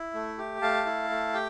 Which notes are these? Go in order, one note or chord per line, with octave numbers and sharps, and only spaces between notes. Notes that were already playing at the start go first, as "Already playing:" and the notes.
Already playing: E4
A3
G4
A3 F5 A5
E4
A3
G4 G5